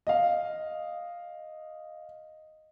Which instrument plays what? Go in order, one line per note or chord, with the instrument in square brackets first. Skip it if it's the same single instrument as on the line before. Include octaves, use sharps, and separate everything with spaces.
[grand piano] D#5 F5